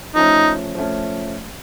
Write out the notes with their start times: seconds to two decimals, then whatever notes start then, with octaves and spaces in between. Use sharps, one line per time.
0.15 F3 A3 C#4 D#4
0.75 F3 A3 C#4